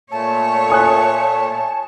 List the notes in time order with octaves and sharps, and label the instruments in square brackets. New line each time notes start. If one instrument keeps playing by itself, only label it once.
[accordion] A#2 A3 [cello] C#5 [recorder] A5
[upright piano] G#5 D#6 F#6